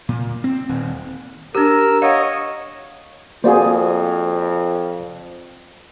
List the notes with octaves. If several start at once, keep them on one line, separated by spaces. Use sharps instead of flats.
A#2
C4
D#1
D4 G4 A#4 E6
C#5 D#5 F5 F#5
F2 A#3 F#4 G#4 C5 D5 F5